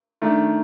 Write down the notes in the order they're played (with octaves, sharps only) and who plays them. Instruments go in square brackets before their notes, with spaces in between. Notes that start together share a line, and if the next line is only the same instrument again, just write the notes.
[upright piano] D#3 A3 D4